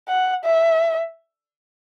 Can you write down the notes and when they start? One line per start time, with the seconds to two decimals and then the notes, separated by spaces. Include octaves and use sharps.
0.08 F#5
0.45 E5